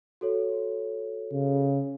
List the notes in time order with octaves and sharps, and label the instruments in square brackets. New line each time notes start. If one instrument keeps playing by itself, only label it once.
[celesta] F#4 A4 C#5
[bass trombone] C#3